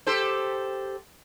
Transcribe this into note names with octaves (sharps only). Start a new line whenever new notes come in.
G4 A4 C5